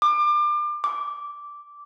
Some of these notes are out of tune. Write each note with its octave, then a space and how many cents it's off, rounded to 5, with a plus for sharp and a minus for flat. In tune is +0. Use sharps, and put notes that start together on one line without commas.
D6 +30
D6 -10